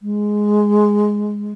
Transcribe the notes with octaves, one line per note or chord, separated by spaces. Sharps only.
G#3